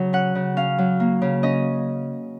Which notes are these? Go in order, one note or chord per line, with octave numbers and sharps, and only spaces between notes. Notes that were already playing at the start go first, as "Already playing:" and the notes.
Already playing: C#3 F#3
C#4 F#5
C#3
C#4 F5
F#3
A#3
C#3
C#4 D#5